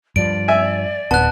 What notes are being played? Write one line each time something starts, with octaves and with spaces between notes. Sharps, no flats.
G2 F3 D5 D7
E5 G#5
D1 B3 A5 F#6